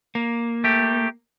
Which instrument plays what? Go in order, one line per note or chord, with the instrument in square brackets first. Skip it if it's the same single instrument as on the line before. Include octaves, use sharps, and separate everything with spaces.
[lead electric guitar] A#3
[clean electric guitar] A3 G4